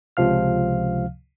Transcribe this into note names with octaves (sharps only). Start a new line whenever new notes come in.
C#2 C3 F3 F5 F6